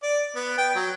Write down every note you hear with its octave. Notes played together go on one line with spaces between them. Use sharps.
D5
B3
G5
F#3